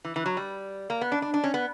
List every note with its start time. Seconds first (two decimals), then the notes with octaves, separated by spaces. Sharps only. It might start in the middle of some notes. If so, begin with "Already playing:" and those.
0.05 E3
0.16 E3
0.26 F#3
0.37 G3
0.90 A#3
1.01 B3
1.12 D4
1.22 D4
1.34 D4
1.44 C#4
1.54 B3